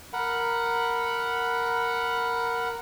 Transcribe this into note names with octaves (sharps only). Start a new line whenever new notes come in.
A#4 F#5 B5